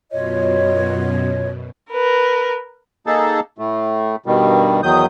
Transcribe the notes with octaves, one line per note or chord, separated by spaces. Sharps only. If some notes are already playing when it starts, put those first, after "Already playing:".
F#2 B2 F4 C#5 D#5
A#4 B4
A#3 D#4 G#4 A4 A5
A2 A3
G2 B2 D#3 G3
E2 D#3 F#3 D#6 G6